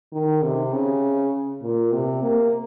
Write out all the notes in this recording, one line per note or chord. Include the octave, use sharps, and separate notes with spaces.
D#3
C3
C#3
A#2
C3
A#3